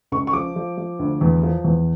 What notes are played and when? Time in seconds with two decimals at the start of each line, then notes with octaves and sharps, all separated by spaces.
0.12 C#2 C#6
0.27 C#6
0.33 F3 D6
0.56 F3
0.77 F3
0.99 D2
1.21 E2
1.43 F3
1.64 E2